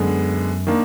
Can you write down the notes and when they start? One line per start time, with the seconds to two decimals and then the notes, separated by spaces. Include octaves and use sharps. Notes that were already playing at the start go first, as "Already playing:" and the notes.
Already playing: F#2 D3 G#3 B3
0.67 D#3 A#3 D4